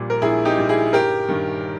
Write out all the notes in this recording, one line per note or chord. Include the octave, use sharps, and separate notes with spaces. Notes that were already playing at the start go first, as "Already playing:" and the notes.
Already playing: A#1 A#2 G3
A#4
A#1 E4 G#4
D#4 G4
A#2 G3
E4 G#4
G1 G4 A#4
G2 D#3